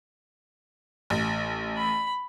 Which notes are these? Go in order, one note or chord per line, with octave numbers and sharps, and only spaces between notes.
A1
B5